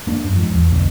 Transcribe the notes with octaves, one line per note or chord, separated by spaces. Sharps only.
A#3 D4
F#2
G#2 F3
E2
B1 F2 B2 D3